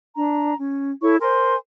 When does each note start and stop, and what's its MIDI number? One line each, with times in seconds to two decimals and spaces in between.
0.16 0.54 62
0.16 0.54 82
0.58 0.92 61
1.02 1.16 64
1.02 1.16 69
1.02 1.16 73
1.02 1.16 85
1.21 1.55 70
1.21 1.55 72
1.21 1.55 80
1.21 1.55 84